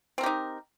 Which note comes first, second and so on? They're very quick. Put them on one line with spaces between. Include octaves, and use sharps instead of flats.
C4 A#4 G4 D#4